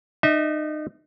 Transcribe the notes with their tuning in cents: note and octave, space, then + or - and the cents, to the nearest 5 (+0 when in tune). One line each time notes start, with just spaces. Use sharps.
D#4 -35 E5 -35